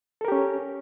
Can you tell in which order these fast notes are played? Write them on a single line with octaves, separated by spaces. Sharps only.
A4 A#4 G4 C#4